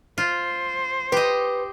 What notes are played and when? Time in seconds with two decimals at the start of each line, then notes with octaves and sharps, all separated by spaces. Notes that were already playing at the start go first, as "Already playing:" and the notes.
0.18 F4 C5
1.12 G4 B4 D#5